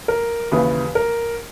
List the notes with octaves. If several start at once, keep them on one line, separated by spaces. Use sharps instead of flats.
A#4
D#2 C#3 E3 B4
A#4